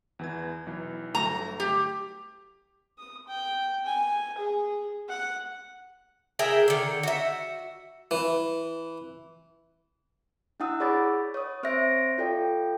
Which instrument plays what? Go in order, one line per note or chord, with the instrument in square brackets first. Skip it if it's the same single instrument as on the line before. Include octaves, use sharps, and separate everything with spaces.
[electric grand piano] E2 E3 G#6
B1 E3
[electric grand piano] G1 F#3 A3 [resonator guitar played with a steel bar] A#5
[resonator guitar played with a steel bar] G4
[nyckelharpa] D#6
G5
G#5
G#4
F#5
[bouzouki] G#4 A#4 E5 G5
D3 D#3
F#4 E5
[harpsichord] E3
[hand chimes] D4 E4 F#5 D#6 E6
G#4 C#5 D5 B5 D6 A6
C#5 D#6
C4 C5 C#5 E5 A#6 D7
F4 A4 D5 G5